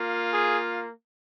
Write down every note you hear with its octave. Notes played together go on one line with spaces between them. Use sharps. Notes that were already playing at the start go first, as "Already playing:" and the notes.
Already playing: A#3 F4
G#4